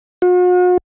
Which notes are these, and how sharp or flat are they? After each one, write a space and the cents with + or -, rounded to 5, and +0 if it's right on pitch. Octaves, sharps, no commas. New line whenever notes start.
F#4 -45